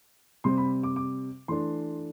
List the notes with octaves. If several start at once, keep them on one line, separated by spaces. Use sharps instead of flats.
C3 G3 C4 C6
B5
D6
D6
E3 A3 D4 C6